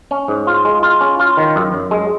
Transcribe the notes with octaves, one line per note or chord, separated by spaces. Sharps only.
C#4
G#2
F4
G#3
F4
C#4
F4
D#3
F#2
F#2
G#3